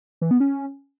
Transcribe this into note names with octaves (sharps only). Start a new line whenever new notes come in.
E3
B3
C#4